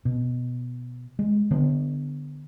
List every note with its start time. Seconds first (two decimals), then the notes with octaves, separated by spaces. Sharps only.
0.05 B2
1.19 G#3
1.51 D3 B3